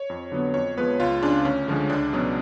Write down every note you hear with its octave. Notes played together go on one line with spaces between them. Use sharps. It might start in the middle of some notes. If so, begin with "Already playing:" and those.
Already playing: C#5
F2
D3 F#3 B3
F2 C#5
F3 G#3 B3 B4
C#2 F4
C#3 G#3 C#4 D4
D2 C#4
D3 F3 G#3
C#2 D4
B2 F#3 C#4